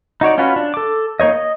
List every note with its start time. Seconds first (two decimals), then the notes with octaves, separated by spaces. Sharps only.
0.21 D#4 F#4 C#5 D5
0.38 C#4 F4 F#4 B4
0.56 D4
0.74 A4 D6
1.20 A#3 D#4 C#5 D#5
1.33 D#5